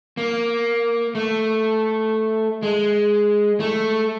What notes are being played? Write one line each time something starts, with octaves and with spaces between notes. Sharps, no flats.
A#3
A3
G#3
A3